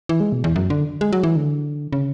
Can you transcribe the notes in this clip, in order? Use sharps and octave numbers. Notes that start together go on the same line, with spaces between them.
E3
G#3
B2
E2
F#2
D3
G#3
F#3
E3
D3
C#3